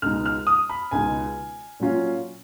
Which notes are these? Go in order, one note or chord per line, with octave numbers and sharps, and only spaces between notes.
C#2 B2 G#3 D#4 F6
F6
D#6
B5
C#2 B2 G#3 D#4 G#5
A#2 F#3 C#4 F4